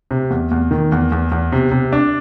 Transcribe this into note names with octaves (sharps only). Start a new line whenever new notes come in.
C3
E2
E2
D#3
E2
E2
E2
C3
C3
D4